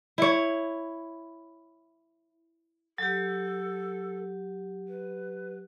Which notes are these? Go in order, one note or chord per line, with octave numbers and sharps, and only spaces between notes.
E4 C#5
F#3 G4 A4
B4